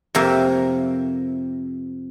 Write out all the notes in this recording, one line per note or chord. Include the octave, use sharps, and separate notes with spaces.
F2 C3 A#3 A#4 E5